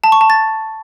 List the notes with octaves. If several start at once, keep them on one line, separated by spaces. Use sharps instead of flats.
A5
C#6
A5
A6